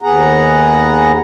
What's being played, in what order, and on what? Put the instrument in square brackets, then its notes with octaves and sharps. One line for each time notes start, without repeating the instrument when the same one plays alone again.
[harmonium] D#2 B3 G#4 F#5 A#5